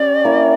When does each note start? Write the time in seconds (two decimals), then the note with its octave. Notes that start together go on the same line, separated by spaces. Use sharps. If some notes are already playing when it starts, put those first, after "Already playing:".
Already playing: C#4 G4 D5
0.24 A#3 E4 A#4